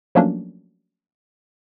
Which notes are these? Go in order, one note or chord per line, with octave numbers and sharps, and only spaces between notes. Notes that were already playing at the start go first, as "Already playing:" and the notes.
F3 F#3 A3 A#3 C#4 D4